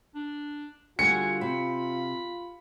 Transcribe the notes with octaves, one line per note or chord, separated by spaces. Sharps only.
D4
D3 G3 F4 F#4 G#5 C#7
C3 B5